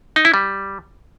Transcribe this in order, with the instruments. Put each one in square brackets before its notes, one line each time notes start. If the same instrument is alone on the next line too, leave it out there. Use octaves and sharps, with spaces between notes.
[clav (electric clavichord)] D#4
E4
G3